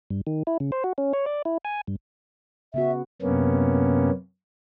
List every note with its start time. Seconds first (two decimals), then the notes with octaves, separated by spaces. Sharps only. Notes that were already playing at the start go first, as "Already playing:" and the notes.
0.10 G2
0.27 D#3
0.47 E4
0.60 C#3
0.72 C5
0.84 F#4
0.98 C#4
1.13 C#5
1.26 D5
1.45 E4
1.65 G#5
1.87 G2
2.74 C#3 B3 F#4 E5
3.22 F#2 C3 A#3 B3 C#4